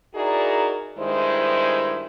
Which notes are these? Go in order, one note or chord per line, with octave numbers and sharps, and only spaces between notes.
D#4 E4 F#4 G#4 A#4 D5
G2 D#3 G#3 E4 C5